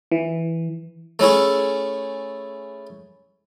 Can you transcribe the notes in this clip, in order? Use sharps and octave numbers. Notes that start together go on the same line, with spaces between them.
E3
A3 C#4 E4 G#4